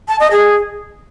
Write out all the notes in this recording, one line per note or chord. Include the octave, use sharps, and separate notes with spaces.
A5
D#5
G#4